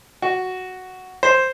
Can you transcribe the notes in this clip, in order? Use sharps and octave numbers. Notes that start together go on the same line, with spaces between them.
F#4
C5